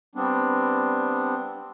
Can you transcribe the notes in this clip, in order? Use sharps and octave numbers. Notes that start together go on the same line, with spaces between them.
G3 B3 C4 D4